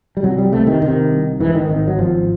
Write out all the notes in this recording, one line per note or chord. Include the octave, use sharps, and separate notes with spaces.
G3
C2 F#3
G3
C3 A3
D#3
C3 D#3
C2
G#2 E3
D#3
G#1 D#3
F#3
G#1 F3